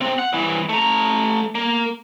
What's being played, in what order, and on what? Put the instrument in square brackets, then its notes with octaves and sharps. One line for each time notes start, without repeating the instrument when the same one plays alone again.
[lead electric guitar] C3 C4
F#5
C2 E3
A3 A#5
A#3